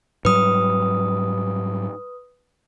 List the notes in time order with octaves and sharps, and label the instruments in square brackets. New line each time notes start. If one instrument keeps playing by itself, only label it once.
[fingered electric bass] G#2 F#3 G3 [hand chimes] B4 D#6